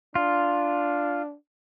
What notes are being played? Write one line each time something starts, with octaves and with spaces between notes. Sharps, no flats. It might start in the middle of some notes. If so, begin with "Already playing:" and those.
D4 F4